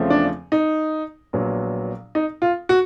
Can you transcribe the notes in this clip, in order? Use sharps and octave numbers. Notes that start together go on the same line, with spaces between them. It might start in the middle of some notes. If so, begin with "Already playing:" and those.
Already playing: E2 C#3 F3 A3 C4
D4
D#4
A#1 A#2 F#3 B3
D#4
F4
F#4